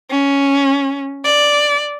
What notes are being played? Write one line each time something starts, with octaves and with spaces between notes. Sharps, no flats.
C#4
D5